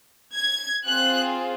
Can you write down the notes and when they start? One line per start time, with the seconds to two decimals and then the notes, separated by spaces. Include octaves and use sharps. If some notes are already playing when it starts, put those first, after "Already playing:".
0.37 G#6
0.85 C4 F4 G#4 F#6